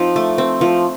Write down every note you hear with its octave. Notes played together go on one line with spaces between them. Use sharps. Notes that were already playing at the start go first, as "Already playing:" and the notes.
Already playing: F3 C4 D#4
A3
C4
F3